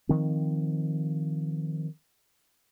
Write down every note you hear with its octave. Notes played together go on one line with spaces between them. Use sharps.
D#3 F3 C4